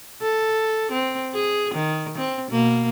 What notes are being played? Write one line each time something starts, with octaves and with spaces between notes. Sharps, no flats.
A4
C4
G#4
D#3
C4
B2 A#3